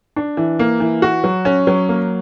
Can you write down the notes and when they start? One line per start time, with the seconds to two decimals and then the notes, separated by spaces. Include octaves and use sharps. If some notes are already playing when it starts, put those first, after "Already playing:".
0.16 D4
0.37 E3
0.59 A#3
0.80 E3
1.02 F#4
1.24 F#3
1.45 C#4
1.67 F#3
1.89 A#3